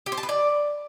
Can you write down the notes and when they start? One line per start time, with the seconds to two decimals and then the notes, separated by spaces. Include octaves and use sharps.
0.06 G4
0.12 C5
0.18 A5
0.23 B4
0.29 D5